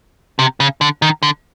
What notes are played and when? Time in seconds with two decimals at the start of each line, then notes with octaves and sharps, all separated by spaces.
0.39 C3
0.60 C#3
0.81 D3
1.02 D#3
1.23 D3